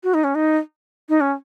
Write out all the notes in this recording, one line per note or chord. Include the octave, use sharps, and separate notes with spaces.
F#4
D#4
C#4
D#4
D#4
C#4